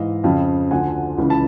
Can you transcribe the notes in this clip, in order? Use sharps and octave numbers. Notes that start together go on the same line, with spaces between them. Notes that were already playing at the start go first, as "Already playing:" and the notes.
Already playing: G#2 E3 D#5 F5
F2 C#3 F3 F5 G5
D2 D3 F3 F#5 G#5
C#2 C#3 E3
A5 B5